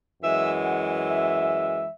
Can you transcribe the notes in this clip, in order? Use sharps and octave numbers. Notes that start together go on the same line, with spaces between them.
F#2 E3 G#3 E5
F#5
E5